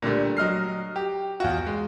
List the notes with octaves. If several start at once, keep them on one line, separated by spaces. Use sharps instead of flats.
A#2 D3 G3 A3
F#3 D#5 F6 C7
G4
E2 F4 F#4
G#3